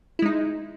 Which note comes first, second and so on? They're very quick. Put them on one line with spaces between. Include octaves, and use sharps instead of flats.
E4 G#3 D#4